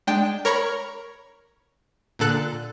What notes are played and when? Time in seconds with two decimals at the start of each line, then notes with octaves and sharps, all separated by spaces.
0.07 G#3 D4 G5
0.45 A#4 C#5 A#5 B5 C#6
2.19 A#2 D3 A4 F#6